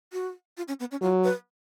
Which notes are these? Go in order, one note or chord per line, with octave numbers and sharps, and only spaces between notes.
F#4
F4
C#4
B3
C#4
F#3 F4
B4